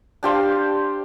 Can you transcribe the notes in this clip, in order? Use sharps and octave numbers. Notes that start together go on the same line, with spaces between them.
D4 G4 C5 F5